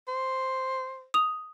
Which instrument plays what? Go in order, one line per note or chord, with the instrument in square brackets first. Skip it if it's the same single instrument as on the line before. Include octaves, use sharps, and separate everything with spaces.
[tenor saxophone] C5
[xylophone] D#6 F7